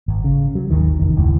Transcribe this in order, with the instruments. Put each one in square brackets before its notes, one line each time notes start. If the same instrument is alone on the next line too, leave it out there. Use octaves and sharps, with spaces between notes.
[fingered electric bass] G#1
C#3
F#3
G#1 D#2 D#3
F1 E2 D#3
F1 D2 G#2 E3